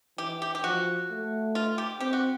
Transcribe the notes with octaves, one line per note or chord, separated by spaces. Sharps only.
E3 G4
G4
G4
F3 F#4
A3
F4
G4
C4 G4
F#4